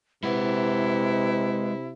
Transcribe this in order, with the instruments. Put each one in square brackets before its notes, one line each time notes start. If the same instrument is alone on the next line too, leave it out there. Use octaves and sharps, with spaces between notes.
[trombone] C3 [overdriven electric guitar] G#3 F#5 [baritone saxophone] E4 [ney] B4